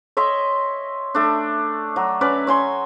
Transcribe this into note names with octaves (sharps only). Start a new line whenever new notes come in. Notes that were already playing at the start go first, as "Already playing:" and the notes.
C#5 D#5 E5 C6
A3 D4
F#3
C#4 B4 D5
C#5 G#5 C6 C#6